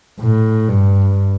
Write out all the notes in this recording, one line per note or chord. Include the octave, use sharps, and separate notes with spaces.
A2
G2